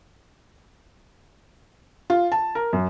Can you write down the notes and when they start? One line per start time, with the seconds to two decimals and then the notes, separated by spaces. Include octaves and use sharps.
2.10 F4
2.32 A5
2.55 A#4
2.73 F#2